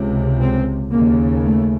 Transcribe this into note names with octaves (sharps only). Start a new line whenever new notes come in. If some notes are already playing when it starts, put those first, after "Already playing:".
Already playing: C#2 C3
C4
D#2 C#3 A#3
A3